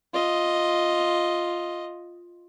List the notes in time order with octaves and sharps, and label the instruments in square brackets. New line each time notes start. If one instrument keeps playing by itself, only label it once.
[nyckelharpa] F4 D#5